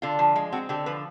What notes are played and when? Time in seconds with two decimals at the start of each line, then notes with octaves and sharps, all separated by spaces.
0.02 D3 F4
0.19 F3
0.36 G#3
0.52 C4 F#4
0.69 D3 G4
0.86 F3 B4